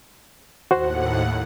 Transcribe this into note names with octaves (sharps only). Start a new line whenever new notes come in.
D#2 A2 F#4 C5 F#5